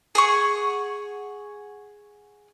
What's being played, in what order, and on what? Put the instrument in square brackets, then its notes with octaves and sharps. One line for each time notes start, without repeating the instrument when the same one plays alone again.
[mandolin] G#4 F#5 C#6